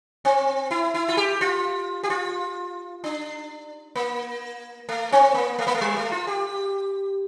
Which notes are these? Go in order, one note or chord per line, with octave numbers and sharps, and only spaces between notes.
C4
E4
E4
F4
G4
F4
G4
F4
D4
A#3
A3
C4
A#3
A3
A#3
A3
G3
A3
F4
G4